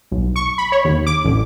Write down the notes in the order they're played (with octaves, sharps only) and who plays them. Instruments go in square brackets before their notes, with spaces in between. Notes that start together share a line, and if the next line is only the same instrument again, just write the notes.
[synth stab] B1
C#6
B5
C#5
D#2
D6
A1